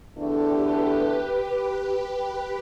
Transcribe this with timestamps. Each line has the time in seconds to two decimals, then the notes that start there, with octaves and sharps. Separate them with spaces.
0.18 E2 D3 A3 D4 G4 A4
0.50 B4